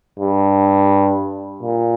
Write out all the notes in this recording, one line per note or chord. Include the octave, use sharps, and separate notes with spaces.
G2
A#2